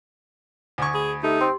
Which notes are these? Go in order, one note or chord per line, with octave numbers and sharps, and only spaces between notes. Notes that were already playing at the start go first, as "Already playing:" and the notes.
D2 G#5 C#6 D#6 G#6
G#4 B5
A3 D#4 G4
C4 C6